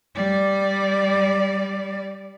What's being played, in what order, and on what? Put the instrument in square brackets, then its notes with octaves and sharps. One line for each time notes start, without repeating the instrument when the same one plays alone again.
[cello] G3 D5